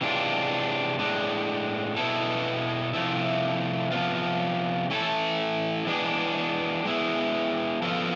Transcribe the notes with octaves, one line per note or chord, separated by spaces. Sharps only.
C3 E3 G#3 D4 F4
A2 G#3 D4
B2 B3 E4 A4
C3 F3 A3 E4
C3 F3 B3 F4
E3 A3 E4 A4
E3 G#3 B3 D4 G#4
G#3 B3 E4
F3 B3 F4 A4